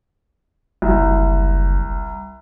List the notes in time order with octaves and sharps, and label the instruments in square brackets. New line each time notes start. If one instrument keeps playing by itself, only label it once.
[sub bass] F#1 [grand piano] C2